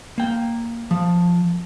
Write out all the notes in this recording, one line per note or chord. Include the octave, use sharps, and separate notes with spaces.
A#3 G5
F3